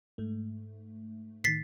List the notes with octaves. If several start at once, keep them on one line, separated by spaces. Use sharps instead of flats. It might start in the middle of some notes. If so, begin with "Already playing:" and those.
G#2 A3
A2 D#3 A6 B6 C7